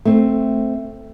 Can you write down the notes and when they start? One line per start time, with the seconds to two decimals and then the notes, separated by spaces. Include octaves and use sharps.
0.05 A3 C4